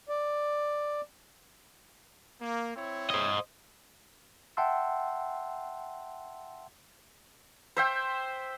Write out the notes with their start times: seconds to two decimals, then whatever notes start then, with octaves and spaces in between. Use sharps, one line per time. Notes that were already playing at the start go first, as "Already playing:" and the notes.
0.09 D5
2.40 A#3
2.76 C4 E4 C#5
3.10 C5 D#5
4.57 E5 F#5 G5 A5 C6 E6
7.77 C5 E5 G5